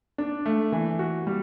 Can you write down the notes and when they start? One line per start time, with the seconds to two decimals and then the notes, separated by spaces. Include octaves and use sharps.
0.18 D4
0.46 A3
0.72 E3
0.99 F#4
1.27 G3